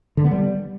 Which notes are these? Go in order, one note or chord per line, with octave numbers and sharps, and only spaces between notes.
D3
B3
G3